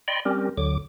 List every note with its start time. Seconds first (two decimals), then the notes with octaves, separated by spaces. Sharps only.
0.08 D5 D#5 G5 B5 C6
0.25 G3 C4 C#4 G4 A#4
0.58 D2 D3 F#3 D6